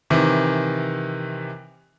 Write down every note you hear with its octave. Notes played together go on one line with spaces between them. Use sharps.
C3 D#3 E3